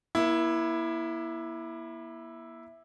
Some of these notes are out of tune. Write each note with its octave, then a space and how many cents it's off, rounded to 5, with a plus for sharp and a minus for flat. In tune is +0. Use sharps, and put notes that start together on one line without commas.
A#3 +40 E4 +0